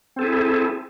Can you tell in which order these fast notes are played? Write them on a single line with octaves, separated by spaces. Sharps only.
C4 A4 G#4 E4